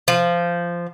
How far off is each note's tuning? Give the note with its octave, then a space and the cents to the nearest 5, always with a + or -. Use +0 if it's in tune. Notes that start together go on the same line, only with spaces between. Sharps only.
F3 -15